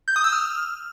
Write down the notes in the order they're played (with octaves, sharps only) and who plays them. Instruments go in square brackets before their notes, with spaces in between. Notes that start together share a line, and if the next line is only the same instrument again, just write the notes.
[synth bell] G6
D#6
E6
F6